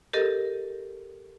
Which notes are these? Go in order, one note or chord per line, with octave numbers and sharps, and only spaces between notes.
G4 A4 A#4 D#5